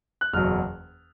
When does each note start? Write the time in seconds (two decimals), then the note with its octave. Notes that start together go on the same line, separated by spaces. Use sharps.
0.21 F#6
0.33 F#1 E2 B2 F#3 F6